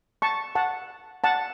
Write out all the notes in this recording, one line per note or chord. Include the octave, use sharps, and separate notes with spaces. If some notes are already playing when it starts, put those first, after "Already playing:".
A5 C#6
F#5 A5
F#5 A5